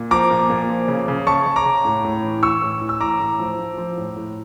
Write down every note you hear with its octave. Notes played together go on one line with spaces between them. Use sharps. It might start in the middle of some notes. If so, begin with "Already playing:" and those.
Already playing: A#2
F3 A#5 D6
A#2
A#2
F3
C#3
C#3
C#3 A5 C#6
C#3
A#5 D6
C#3
A2
A2
E3
E3 C#6 E6
A2
E3
E6
A2 A#5 D6
A2
F3
F3
F3
A2
A2